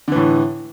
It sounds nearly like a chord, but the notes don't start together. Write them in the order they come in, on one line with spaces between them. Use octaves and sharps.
D3 E3 A2